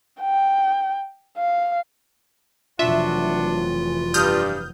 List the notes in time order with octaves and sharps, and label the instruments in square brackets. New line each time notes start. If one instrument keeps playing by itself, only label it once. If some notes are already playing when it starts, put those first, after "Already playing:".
[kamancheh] G5
F5
[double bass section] F1 E3 F#3 [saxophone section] D4 F#4 [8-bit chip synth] F4 [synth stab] E5
[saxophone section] G2 [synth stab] D#6 F6 G6